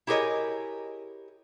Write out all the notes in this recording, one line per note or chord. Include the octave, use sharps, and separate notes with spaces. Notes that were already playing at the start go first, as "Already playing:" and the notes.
E4 G4 G#4 A#4 C#5 D#5